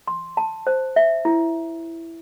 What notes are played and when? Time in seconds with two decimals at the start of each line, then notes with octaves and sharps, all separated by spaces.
0.08 C6
0.37 A5
0.67 C5
0.96 E5
1.25 E4